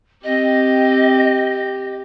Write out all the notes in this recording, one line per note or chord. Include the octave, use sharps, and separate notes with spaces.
C4 G4 D#5